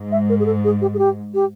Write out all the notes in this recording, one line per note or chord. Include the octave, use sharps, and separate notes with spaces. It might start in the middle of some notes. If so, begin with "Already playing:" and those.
Already playing: G#2
E5
A#4
G#4
A4
G#4
G4
G#4
G4
G4